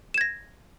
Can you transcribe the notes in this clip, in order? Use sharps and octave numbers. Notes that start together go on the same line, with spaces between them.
G#6 A#6 E7